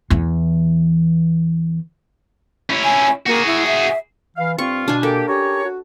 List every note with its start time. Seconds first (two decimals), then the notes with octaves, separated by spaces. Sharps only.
0.10 E2 E3
2.70 C#4 E4
2.84 G#5
3.26 A#3 F#4 G#4
3.46 E4
3.67 E5
4.37 E3 F5
4.58 G2 C4 F4 C#6
4.88 B2 D4 G#5
5.03 A#3 G4 A4
5.28 C#4 G4 A#4 C#5
5.65 F#4